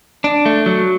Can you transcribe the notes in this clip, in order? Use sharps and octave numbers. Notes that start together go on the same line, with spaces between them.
D4
A3
F#3